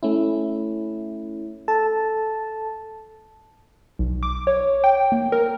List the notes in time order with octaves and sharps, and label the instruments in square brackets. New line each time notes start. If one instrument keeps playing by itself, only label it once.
[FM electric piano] A3 C#4 E4
A4 A5
[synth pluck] B1
D6
C#5
G5
A#3
A#4